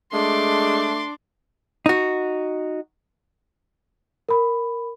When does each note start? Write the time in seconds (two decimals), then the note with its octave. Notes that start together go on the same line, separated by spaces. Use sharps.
0.13 G#3 A3 D4 C6 D6
1.86 D#4 F#4
4.29 A#4 B5